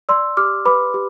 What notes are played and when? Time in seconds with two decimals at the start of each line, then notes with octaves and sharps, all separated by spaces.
0.09 D5 C6 E6
0.37 G4 D6 F6
0.65 B4 B5 D6
0.94 G4